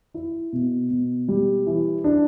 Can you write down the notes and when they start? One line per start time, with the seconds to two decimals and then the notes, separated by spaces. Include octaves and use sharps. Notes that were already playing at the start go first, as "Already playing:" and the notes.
0.14 E4
0.53 B2
0.90 B2
1.28 G3
1.67 E3
2.04 D4